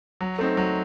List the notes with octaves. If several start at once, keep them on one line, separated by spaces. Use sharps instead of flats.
F#3
A3 C4 D#4
F#3